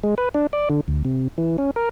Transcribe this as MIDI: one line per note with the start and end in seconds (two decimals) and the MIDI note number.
0.03 0.15 56
0.18 0.29 71
0.34 0.47 62
0.53 0.69 74
0.70 0.81 50
0.88 1.03 38
1.05 1.28 48
1.38 1.57 52
1.58 1.71 61
1.76 1.89 70